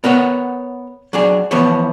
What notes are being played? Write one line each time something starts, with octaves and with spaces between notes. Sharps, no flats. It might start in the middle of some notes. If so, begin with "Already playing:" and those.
B3 A#4 C#5 F#5
F#3 D4 G#4
E3 F3 B3 C#5